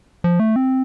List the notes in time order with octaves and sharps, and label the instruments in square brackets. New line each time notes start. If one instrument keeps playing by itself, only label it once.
[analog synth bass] F3
A3
C4